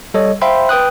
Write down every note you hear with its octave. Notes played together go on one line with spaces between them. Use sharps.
G3 A4 C#5 D#5
C5 E5 F5 G5 B5 C6
B4 G5 D#6 F#6